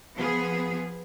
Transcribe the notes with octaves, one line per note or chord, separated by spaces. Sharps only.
F3 B3 G#4